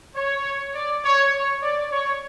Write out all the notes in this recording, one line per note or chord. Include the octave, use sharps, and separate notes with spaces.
C#5
D5
C#5
C#5
D5
C#5